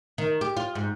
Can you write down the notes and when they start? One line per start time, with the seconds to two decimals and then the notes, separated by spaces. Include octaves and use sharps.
0.18 D#3
0.41 G4
0.57 F4
0.75 G#2